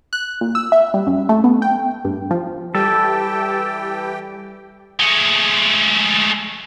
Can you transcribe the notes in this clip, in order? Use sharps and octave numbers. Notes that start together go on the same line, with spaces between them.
F#6
A#2
E6
E5
G3
F#2
A3
B3
G5
G2
F3
E3 G3 G4 A4 G5
G#3 A3